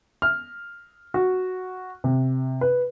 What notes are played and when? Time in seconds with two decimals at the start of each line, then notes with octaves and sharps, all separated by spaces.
0.22 F6
1.14 F#4
2.04 C3
2.61 B4